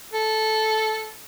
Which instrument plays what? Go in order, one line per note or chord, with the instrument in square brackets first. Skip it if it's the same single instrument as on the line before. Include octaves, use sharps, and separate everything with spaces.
[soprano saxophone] A4